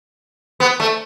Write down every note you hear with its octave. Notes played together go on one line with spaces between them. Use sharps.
B3
A3